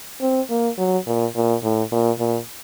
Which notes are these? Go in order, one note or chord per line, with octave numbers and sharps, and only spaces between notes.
C4
A#3
F#3
A#2
A#2
A2
A#2
A#2